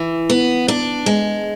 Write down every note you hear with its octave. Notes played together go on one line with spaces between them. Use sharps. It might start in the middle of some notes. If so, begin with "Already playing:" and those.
Already playing: E3
B3
D4
G#3